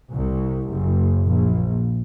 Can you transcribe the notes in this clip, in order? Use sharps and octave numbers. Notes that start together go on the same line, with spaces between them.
C2
F#1
A#1